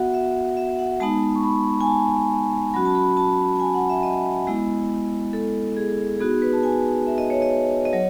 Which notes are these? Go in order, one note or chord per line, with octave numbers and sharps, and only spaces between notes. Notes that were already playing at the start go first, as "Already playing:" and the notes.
Already playing: B3 F#4 E5 F#5
E5
E5
F#5
G#3 B3 D#4 A5
C#6
B5
G#5
A5
F#3 C#4 F#4 B5
A5
B5
A5
G#5
F#5
E5
D#5
G#3 B3 E4
A4
G#4
B3 D#4 F#4 G#4
B4
A5
G#5
E5
D#5
C#5
D#5
D#5
F#3 C#5